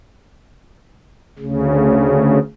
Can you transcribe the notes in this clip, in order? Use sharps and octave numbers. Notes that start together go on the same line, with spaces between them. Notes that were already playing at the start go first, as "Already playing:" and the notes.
D2 C#3